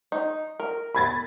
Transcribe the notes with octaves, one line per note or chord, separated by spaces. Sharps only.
D#4
A#4
B5 G#6 A6